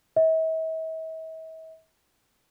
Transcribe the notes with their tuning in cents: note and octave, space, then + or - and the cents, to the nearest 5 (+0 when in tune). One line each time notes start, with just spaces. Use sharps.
E5 -45